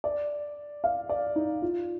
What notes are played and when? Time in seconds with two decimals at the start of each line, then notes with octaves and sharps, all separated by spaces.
0.04 D5
0.84 F5
1.09 D5
1.36 D#4
1.62 F4